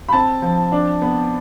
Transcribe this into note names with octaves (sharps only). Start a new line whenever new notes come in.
B5
C4 A5
F3
D4
B3